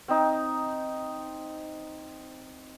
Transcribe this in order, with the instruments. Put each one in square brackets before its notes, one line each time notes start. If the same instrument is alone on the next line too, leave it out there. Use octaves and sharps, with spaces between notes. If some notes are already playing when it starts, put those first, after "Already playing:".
[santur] C4 D#4